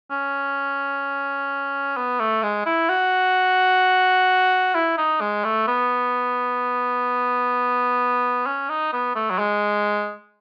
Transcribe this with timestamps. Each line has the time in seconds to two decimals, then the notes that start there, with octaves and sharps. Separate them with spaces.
0.11 C#4
1.97 B3
2.20 A3
2.43 G#3
2.66 E4
2.89 F#4
4.75 E4
4.98 D#4
5.21 G#3
5.44 A3
5.67 B3
8.46 C#4
8.69 D#4
8.93 B3
9.16 A3
9.30 F#3
9.39 G#3